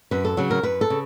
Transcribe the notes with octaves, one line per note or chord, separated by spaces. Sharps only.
F#2 B4
A4
C#3 F#3
A#4
F#2 B4
A4
C#3